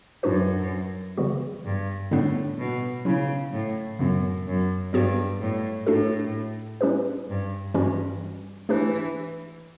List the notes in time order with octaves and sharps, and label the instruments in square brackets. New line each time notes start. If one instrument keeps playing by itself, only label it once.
[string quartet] F#2 [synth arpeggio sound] A2 G3 D4 F#4 B4
[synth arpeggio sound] C#3 E3 G3 B3 F#4
[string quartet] G2
[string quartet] A2 [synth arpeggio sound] D3 G3 B3 D4
[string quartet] B2
[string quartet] C#3 [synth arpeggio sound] F#3 C#4 E4
[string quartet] A2
[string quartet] F#2 [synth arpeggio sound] C#3 E3 B3
[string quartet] F#2
[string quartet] G2 [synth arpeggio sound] F#3 B3 F#4
[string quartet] A2
[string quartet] A2 [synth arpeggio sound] A3 D4 F#4 A4
[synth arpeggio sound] G3 C#4 E4 G4 B4
[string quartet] G2
[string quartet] G2 [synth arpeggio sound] E3 G3 C#4 F#4
[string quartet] E3 [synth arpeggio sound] A3 D4 G4 B4